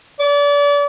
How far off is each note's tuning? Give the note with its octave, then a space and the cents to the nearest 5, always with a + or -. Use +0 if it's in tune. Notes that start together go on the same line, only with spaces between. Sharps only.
D5 -35